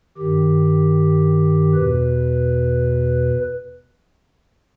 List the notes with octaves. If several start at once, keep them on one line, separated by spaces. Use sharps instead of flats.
G2 D#3 G4
E2 B2 B4